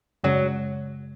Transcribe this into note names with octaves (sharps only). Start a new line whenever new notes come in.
F#2 C#3 F#3 G#3